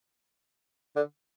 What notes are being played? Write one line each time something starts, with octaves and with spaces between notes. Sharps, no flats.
D3